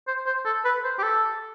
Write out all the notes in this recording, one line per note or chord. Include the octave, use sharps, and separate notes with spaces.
C5
C5
A4
B4
C5
G4
A4